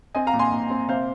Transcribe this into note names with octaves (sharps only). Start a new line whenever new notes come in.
C4 D#5 G#5
F5 A#5
A#2
G#5 C6
A#2
C4
C3 C5 F5